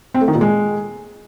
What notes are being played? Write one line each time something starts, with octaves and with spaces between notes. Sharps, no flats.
C4
A3
D#3
A#2
G#3